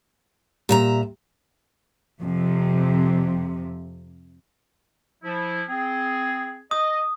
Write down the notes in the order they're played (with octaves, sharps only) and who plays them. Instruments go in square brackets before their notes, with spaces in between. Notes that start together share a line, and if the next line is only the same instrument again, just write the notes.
[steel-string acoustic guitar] A#2 E5 A#5 [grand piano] G3
[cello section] F2 C3
[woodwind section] F3 E4
C4 G#4
[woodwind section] D#5 [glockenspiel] D#6